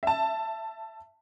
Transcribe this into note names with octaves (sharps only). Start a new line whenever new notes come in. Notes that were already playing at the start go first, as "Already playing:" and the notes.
E5 A5